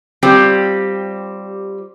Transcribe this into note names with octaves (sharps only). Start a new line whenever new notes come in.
G3 C4 F4 G4